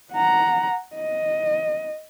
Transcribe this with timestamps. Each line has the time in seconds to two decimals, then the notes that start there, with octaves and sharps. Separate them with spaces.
0.13 F#5 A#5
0.95 D#5